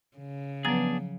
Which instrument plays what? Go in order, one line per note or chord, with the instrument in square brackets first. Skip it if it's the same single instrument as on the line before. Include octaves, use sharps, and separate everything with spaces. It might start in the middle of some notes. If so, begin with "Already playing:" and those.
[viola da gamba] C#3
[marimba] F3 F#3 A#5 [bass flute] B3 [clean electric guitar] D4 G#4